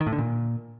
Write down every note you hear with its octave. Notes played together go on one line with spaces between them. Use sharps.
D#3
A2
D3
A#2